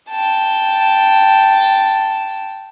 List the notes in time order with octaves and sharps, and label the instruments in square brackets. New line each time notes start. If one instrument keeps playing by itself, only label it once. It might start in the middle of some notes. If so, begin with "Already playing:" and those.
[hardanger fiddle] G5 A5